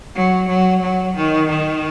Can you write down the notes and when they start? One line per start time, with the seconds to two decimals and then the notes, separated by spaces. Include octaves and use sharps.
0.15 F#3
0.47 F#3
0.81 F#3
1.15 D#3
1.49 D#3